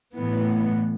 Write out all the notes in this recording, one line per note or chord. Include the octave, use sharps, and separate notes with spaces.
A2 E3 B3